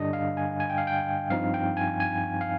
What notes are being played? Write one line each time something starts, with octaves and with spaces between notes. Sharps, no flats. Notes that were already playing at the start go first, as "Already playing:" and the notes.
Already playing: G2 D3 G3 D4 D#5
F5
G#5
G#5
G5
F5
G5
G2 F3 C4 D#4 F5
G5
G#5
G#5
F5